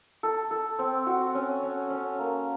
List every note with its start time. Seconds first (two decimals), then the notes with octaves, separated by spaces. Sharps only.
0.23 A4
0.51 A4
0.79 C4
1.07 F#4
1.35 C#4
1.63 C#4
1.90 C#4
2.19 A#3